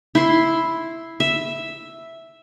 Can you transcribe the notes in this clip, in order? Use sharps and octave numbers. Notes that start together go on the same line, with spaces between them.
E4 C6
E5